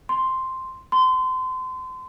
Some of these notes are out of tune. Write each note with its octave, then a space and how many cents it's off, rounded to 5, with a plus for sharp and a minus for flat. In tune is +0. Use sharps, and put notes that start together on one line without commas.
C6 +0
C6 -30